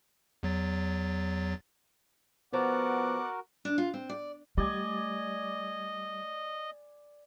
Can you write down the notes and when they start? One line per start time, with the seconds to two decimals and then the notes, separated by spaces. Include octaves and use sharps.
0.43 E2 F#3 A6
2.53 F3 B3 F#4 A#4 D5 F#5 D6
3.65 D4
3.78 F4
3.94 C4
4.09 D5
4.57 G3 A3 D5 D#5 G#5